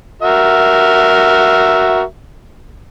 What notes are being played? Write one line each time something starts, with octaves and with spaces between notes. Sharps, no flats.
F#4 A#4 E5